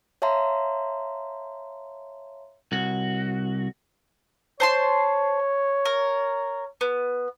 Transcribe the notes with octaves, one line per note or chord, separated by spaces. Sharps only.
C#5 E5 F5 A5 A#5 C6
C2 F#4
C5 C#5 A5 C6
A#4
B3